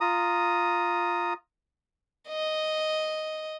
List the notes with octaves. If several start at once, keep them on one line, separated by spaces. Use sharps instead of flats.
F4 A#5 D#6
D#5